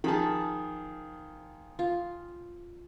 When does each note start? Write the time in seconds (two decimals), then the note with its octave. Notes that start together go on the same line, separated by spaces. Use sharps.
0.04 D#3 F3 G#4 A5 B5
1.79 F4